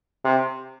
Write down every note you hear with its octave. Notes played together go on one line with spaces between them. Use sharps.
C3